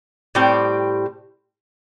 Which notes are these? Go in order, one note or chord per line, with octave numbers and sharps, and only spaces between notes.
A2 G3 C4 G4